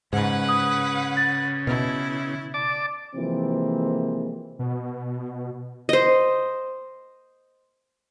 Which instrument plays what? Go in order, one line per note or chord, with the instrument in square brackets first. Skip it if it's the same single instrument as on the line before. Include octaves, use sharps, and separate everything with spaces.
[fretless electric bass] G#2 [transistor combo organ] C#3 [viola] B4 F#5
[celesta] D#6
A6
[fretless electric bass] B2 [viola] E4
[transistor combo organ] D5 A5 D6
[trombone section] C3 E3 F3 G#3 A#3 C4
[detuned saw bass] B2
[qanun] C5 D#5